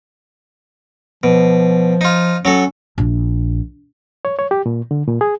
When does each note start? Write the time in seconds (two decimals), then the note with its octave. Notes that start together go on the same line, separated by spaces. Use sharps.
1.23 B2 F3
2.01 D#4 F4
2.45 F#3 C#4 F#4 A4
2.98 A#1
4.25 C#5
4.39 C#5
4.51 G4
4.66 A#2
4.91 D3
5.07 A#2
5.21 G#4